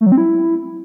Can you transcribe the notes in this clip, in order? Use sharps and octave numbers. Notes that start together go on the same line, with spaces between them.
A3
F#3
C4
E4